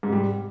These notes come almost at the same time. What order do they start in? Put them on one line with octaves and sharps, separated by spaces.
G#2 C3 G3